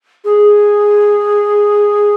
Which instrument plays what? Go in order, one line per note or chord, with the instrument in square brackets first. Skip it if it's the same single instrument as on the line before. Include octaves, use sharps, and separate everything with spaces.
[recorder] G#4